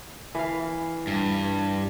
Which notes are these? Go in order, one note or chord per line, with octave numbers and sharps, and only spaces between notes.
E3 F5
G2